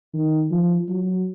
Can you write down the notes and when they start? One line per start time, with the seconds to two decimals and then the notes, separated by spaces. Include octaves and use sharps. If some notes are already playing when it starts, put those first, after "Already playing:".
0.14 D#3
0.51 F3
0.89 F#3